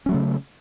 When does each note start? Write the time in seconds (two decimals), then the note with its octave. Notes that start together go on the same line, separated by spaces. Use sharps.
0.06 C#4
0.09 F#3
0.12 A3
0.14 C#3